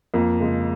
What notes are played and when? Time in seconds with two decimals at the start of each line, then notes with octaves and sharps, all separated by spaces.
0.14 F2 A#3
0.40 C#3 G#3